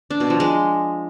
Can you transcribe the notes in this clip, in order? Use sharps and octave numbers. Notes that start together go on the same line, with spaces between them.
D4
B2
F3
G#3